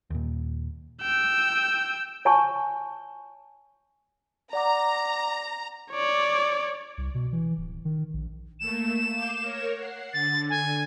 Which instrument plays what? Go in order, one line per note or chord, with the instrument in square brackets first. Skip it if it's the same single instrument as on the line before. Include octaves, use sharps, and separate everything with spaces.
[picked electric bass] D#2 A#2
[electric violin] G5 E6
[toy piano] C#5 G#5 A5 C#6
[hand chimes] D5 F#5 D6 [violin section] A#5
[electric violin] C#5 D5
[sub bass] C2
B2
E3
D1
D#3
A#1
[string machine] A3 A#3 [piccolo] E7
[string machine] F5 D6 G6
A#4 C#5
F#5 C7
[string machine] D3 [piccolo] A6
[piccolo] G#5